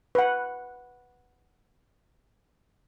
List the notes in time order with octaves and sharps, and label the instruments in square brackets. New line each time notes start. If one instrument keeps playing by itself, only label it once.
[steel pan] B4 F#5